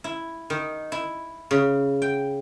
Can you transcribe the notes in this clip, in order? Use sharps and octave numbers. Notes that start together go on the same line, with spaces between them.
E4
D#3
E4
C#3
G5